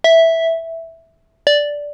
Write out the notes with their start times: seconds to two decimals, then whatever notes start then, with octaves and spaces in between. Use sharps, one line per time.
0.04 E5
1.47 D5